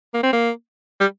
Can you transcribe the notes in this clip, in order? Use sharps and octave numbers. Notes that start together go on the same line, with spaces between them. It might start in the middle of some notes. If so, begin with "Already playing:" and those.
A#3
C4
A#3
G3